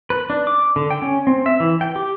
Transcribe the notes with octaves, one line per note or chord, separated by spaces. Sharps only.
B4
D4
D6
D3
G5
C#4
C4
E5
E3
G5
G4